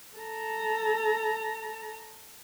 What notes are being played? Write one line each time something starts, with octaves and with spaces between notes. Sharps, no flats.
A4 A#5